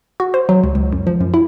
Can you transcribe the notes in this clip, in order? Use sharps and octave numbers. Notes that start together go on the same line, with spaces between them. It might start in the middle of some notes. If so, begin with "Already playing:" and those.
F#4
C5
F#3
C#2
C#2
F#2
F3
F#2
E4